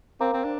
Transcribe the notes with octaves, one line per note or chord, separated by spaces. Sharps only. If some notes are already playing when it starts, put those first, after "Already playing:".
C4 A#4 F5 A#5 D6
C4
D4